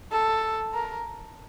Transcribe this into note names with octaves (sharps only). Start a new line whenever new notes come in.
A4
A#4